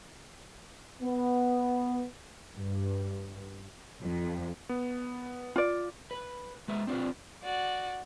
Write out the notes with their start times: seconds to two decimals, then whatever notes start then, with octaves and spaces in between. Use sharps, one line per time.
1.03 B3
2.53 G2
4.02 F2
4.69 B3
5.56 F4 D5
6.11 B4
6.68 G#3 B4 E5
6.87 C4 D4 D#4 F4 B4
7.43 F#4 D5